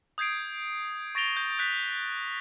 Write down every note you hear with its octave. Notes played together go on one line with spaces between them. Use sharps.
D#6 G6 G#6 C7 D7
C#6 A6 A#6 D7 F7 G7
G6
F#6 G6 B6 D7